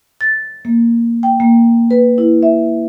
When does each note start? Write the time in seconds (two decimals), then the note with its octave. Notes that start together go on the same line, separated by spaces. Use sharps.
0.21 A6
0.65 A#3
1.23 G5
1.40 A#3
1.91 B4
2.18 E4
2.43 E5